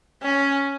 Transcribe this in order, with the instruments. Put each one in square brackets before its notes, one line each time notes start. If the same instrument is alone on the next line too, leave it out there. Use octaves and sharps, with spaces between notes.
[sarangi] C#4